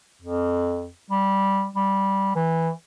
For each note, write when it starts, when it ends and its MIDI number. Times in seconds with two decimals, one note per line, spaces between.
0.22 0.90 41
1.10 1.67 55
1.76 2.31 55
2.35 2.70 52